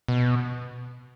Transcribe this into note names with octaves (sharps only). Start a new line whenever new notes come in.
B2